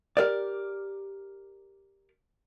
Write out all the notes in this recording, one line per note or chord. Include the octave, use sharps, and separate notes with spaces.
G4 A#4 D5